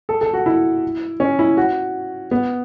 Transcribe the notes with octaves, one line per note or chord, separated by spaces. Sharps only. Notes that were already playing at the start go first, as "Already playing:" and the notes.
A4
A4
F#4
E4
C#4
E4
F#4
B3